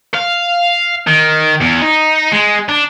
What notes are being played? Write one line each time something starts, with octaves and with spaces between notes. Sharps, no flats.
F5
D#3
E2
D#4
G#3
D4